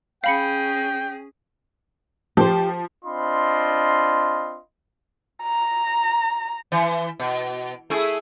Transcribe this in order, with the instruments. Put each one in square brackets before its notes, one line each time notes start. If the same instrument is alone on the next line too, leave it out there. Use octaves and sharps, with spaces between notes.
[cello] C#4 G#4 [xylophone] F5 B5 C#7 [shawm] G5
[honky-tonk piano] F3 [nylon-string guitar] G4 C5
[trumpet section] C4 D4 F4 D#5 B5 C6
[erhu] A#5
[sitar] E3
B2
A3 E4 G#4